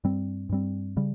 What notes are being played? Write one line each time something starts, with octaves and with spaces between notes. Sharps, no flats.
G2 G3 C4
G2 G3 C4
C#3 G3